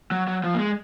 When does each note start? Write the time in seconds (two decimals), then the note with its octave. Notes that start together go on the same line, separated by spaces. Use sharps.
0.11 F#3
0.28 F#3
0.44 F3
0.54 A#3
0.59 G#3